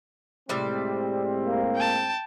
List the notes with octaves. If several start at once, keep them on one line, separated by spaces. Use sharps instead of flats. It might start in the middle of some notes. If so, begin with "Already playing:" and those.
A2 C3 G3 G#3 C4 D5
A#3
G5 A5